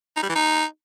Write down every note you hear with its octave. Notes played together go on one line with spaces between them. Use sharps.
D#4
G3
E3
D#4